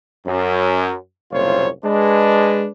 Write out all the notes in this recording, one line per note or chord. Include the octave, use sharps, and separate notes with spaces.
F#2
F#1 C2 A#2 F4 C5 C#5
G#3 D4 B4